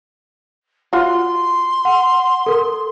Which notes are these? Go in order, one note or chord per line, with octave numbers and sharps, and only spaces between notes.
F4 F#4 C6
F#5
A4 A#4